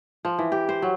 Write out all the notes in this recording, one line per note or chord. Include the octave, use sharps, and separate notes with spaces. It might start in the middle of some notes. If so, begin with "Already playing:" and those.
F3
E3
G4
C5
F#3